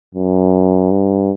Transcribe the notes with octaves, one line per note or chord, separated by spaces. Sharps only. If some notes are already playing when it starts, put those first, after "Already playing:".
F#2
G2